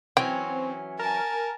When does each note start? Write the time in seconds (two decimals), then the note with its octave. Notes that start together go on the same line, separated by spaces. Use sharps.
0.17 E3 F#3 C4 C#4 G5
0.99 A#4 G#5 A5